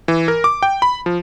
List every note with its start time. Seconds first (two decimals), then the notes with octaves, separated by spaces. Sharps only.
0.08 E3
0.28 A#4
0.44 D6
0.63 G5
0.82 B5
1.06 F3